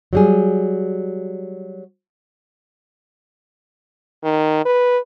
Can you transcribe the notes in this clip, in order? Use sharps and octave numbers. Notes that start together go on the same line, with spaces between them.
F#3 G3 G#4
D#3
B4